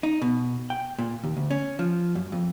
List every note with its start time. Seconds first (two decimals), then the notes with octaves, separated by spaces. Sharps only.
0.03 D#4
0.22 B2
0.70 G5
0.99 A#2
1.24 D#2
1.37 D2
1.51 C#4
1.79 F3
2.15 F#2
2.32 F2